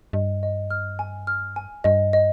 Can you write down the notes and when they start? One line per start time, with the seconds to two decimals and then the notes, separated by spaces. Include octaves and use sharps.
0.13 G2 D#5
0.43 D#5
0.71 F6
0.99 G#5
1.27 F6
1.56 G#5
1.84 G2 D#5
2.13 D#5